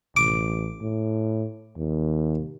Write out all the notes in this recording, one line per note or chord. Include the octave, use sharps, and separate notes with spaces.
A1 D6
A2
D#2